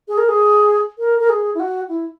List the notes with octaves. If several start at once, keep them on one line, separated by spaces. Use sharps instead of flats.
G#4
A#4
G#4
A#4
A#4
G#4
E4
F#4
E4